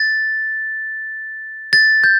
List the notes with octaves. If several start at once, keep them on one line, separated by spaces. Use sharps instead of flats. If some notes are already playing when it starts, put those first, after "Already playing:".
Already playing: A6
A6
G6